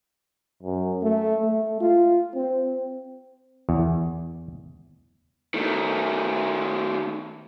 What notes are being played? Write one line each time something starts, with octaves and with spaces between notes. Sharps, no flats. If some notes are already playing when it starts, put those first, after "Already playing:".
F#2
A3
A3
F4
C4
E2
D#3 A3